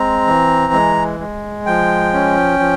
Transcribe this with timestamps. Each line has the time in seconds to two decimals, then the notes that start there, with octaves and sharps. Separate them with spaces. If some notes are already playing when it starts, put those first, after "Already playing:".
Already playing: G#3 C4 A#5
0.27 E3
0.73 G#3
1.20 G#3
1.66 F3 G5
2.13 C#4
2.59 F3